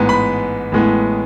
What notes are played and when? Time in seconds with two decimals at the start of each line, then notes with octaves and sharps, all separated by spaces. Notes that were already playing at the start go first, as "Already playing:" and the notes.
Already playing: A1 G#2 G#3 B3
0.09 B5
0.72 A1 A2 G#3 B3